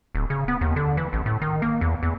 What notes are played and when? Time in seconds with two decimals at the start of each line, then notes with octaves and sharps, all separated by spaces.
0.15 D1
0.30 C#3
0.48 B3
0.61 D#2
0.76 D3
0.97 E3
1.13 A1
1.26 A2
1.42 D#3
1.62 A#3
1.81 E2
2.03 E2